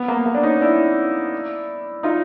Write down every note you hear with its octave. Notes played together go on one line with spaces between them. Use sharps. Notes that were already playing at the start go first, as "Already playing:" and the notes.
Already playing: B3
A#3
A#3
D4
C#4 D#4
D4 E4
D#4 F4